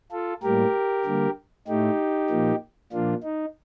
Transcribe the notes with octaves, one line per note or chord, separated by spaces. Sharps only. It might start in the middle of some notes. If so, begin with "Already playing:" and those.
F4 A4
A2 G3 A#3 G4 A#4
D3 G3 A#3
A2 A3 D#4 G4
A#2 F3 A#3
A#2 F3 A#3 D4 F4
D#4